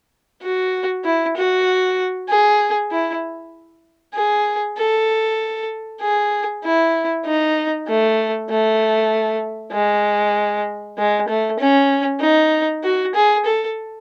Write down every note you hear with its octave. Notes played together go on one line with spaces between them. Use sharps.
F#4
E4
F#4
G#4
E4
G#4
A4
G#4
E4
D#4
A3
A3
G#3
G#3
A3
C#4
D#4
F#4
G#4
A4